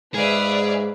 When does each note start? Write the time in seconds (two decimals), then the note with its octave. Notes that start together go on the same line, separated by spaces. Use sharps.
0.14 G#2 G#4 B4 D5 E5 F5